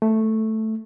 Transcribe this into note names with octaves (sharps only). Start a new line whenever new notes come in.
A3